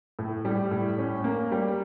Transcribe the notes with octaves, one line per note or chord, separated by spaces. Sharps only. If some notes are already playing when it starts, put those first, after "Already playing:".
A2
G3
A2
C#4
A#3
G3